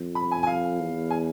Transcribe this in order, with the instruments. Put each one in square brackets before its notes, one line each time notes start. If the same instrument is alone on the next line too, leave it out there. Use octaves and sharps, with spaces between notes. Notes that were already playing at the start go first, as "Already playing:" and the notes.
Already playing: [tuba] F2
[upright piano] B5
G#5
G#5
F5
[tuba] E2
[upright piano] G#5